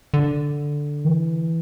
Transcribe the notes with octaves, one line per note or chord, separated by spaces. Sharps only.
D3
E3